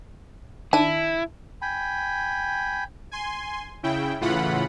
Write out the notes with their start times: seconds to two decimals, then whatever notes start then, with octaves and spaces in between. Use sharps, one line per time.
0.73 D#3 D4 E4 A5 D#7
1.62 G5 G#5 B5
3.11 G#5 C6
3.83 C#3 E4 G5
4.21 A2 C#3 E3 F4 F#5 B5